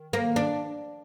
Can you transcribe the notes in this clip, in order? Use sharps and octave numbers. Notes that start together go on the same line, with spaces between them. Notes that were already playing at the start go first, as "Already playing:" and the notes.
Already playing: D#3
A#3
D4